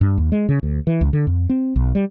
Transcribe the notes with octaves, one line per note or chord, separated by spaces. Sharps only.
G2
D#2
G#3
C#3
D2
E3
C#2
D3
F2
C4
B1
G3